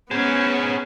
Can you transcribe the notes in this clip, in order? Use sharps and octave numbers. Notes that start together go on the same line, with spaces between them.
B3 C#4 G#4 C5